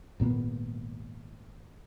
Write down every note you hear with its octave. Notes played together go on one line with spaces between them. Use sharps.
G#1 A#2 A#3 B3